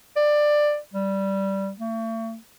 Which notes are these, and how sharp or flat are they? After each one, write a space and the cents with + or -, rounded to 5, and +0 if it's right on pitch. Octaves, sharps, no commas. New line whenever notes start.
D5 +15
G3 -10
A3 +40